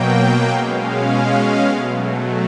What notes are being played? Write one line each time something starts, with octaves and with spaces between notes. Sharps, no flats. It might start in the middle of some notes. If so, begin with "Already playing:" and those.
Already playing: B2 F#3 A#3 G5
B2 G#3 C#4 F5
B2 F#3 A3